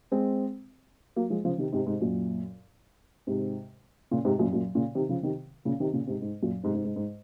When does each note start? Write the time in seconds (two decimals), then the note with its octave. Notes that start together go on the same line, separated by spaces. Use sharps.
0.12 G#3 C4
1.16 F#3 A#3
1.30 F3 G#3
1.45 C#3 F3
1.58 C3 D#3
1.72 G#2 C3
1.86 G#2 C3
2.01 F#2 A#2
3.27 G#2 C3
4.11 A#2 C#3
4.25 G#2 C3
4.39 F#2 A#2
4.53 F#2 A#2
4.75 A#2 C#3
4.95 C3 D#3
5.09 C#3 F3
5.23 C3 D#3
5.65 A#2 C#3
5.80 C3 D#3
5.93 A#2 C#3
6.07 G#2 C3
6.22 G#2
6.43 F#2 A#2
6.63 G#2 C3
6.74 G#2 C3
6.84 G#2
6.96 G#2